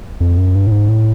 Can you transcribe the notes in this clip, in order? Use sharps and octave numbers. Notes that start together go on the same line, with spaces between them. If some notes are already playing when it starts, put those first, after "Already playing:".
F2
F#2
G2
A2
G#2
A2